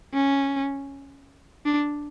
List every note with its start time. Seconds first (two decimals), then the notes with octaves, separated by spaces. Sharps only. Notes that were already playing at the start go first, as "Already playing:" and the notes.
0.14 C#4
1.65 D4